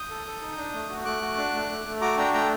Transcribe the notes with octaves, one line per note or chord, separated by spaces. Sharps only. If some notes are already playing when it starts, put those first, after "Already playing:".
Already playing: D#6 G6
A4
A4
D#4
D4
A3
F#4
A3 D6 F#6
F#4
D4
A3
A3
A3
F#4 A#5 D6
D4 G5 A#5
A3 G5 A#5